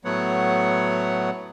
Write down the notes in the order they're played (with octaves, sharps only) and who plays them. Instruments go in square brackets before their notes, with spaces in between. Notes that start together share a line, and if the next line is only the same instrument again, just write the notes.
[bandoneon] A2 F#3 A3 B3 C#5 F#5